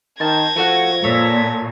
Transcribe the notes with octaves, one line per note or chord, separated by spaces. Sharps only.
D#3 C5 A5 G#6 A#6
F3 A3 F#4 F#5
A#2 A4 C#5 E5